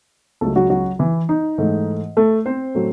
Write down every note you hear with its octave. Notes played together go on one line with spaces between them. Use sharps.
C#2 C#3 F#3 A3 A4
F#3 F#4
F#3 F#4
E3 E4
D#4
G#2 E3 A3
A3 A4
C4 C5
A2 F#3 A3